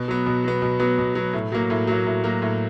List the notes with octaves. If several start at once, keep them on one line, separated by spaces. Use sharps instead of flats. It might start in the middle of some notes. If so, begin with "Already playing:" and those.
Already playing: B2
F#3 B3
B2
F#3 B3
B2
F#3 B3
B2
F#3 B3
A2
F#3 A#3
A2
F#3 A#3
A2
F#3 A#3
A2